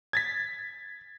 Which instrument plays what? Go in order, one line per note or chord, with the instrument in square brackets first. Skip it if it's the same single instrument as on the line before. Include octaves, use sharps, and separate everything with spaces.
[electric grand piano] G#6 A6 B6